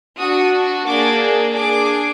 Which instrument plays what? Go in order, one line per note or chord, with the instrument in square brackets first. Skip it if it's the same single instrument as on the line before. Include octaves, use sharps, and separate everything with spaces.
[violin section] D4 F#4 D#6
A#3 D4 G#4 D6
D4 G#4 D6